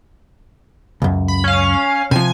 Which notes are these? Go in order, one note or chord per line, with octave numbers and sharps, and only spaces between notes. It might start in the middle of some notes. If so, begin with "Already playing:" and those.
C#2 F#2
B5
C#4 F5
C3 F3 G#5